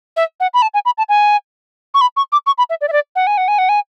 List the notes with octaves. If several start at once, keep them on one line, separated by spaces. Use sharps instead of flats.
E5
F#5
B5
A5
G#5
B5
A5
G#5
C#6
B5
C#6
D6
C#6
B5
E5
D5
E5
D5
F#5
G#5
F#5
G#5
F#5
G#5